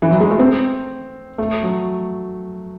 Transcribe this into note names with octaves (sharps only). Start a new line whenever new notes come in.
E3
F#3
G#3
A3
C4
A3
F#3